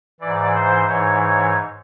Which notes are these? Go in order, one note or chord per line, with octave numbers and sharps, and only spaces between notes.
G#2 E3 D5
C5
G#2 E3 C#5
C#5